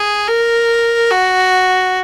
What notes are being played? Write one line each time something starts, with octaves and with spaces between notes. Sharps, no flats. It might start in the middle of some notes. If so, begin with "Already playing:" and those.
Already playing: G#4
A#4
F#4